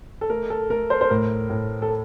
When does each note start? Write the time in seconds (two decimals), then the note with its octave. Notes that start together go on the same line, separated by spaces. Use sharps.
0.21 A4
0.30 A3 A#4
0.50 A4
0.70 A3 A#4
0.90 C5
1.01 C5
1.10 A2 A#4
1.50 A2
1.82 A4